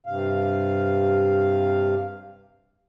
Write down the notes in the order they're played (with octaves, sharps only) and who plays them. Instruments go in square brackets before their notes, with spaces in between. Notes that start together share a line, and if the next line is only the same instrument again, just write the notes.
[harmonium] G2 C3 F5